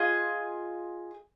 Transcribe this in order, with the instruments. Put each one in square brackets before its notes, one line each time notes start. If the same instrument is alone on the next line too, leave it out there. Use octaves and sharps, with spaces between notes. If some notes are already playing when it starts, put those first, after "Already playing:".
Already playing: [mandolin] F4 G#4 D#5